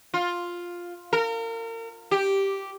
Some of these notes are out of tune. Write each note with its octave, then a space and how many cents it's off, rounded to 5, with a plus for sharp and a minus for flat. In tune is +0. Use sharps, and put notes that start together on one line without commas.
F4 +5
A#4 -35
G4 -5